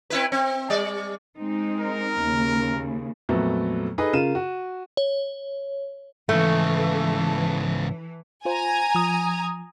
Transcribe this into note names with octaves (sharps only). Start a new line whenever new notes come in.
C4 E4 B4
C4
G3 D5
G#3 C4 D#4
A#4
D#2 C#3
F2 A#2 F#3 A3 B3
D#4 G#4 A4 B4 D#5
C#3 F4 A#4 D#7 E7
F#4
C#5
G#2 C#3 E3 A3
F4 C5 G#5 A#5
F3 D#6